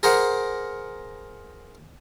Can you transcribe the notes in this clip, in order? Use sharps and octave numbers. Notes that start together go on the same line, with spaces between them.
G#4 A#4 C5 F#5